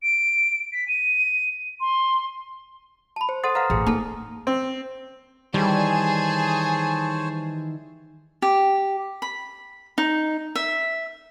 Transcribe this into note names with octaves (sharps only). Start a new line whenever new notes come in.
D7
B6
D#7
C6
A5 B5
C5
A4 C5 F#5 C6 D#6 A6
B4 F5 F#5 A#5 F6
A1 A3 G#4
A#3 D#4 A4
C4
D#3 E3 G3 G#4 C5 C#5 A5
G4
B5
D#4
E5